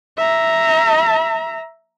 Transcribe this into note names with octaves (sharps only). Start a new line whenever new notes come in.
E5 A#5